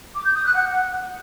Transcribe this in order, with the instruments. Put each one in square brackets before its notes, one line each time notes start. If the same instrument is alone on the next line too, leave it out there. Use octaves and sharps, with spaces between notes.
[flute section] D6
G6
D#6
F#6
F#5